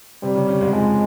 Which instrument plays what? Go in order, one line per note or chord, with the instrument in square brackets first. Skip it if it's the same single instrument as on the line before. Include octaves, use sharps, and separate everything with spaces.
[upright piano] C3 C4 [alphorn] G3
[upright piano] C#3 C#4
C#3 C#4
G#2 G#3
[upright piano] F2 F3 [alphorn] G#3